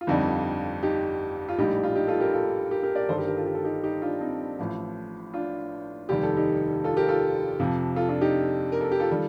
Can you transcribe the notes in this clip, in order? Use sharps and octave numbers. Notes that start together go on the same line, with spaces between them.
F4
G1 F2 D3 G3 C4 D#4
D#4 G4
F4
A#1 A2 G3 D#4 G4
F4
D#4 G4
F4 A4
G4 A#4
F4 A4
G4 A#4
G4 A#4
A#4 D5
G1 G2 D#3 G3 A4 C5
G4 A#4
G4 A#4
F4 A4
G4
A4
D#4 G4
D#4 G4
D4 F4
C4 D#4
A1 A2 F3
D4 F4
F1 D#2 D#3 G3 G4
A4
D#4 G4
F4 A4
G4 A#4
F4 A4
F2 C3 F3
F4 A4
D4 F4
D#4 G4
A#4
A4
G4
F4 A4
D#3 G3